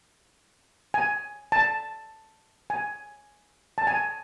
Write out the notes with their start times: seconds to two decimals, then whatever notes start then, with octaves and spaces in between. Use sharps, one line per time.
0.94 G#5
1.52 A5
2.70 G#5
3.78 A5
3.87 G#5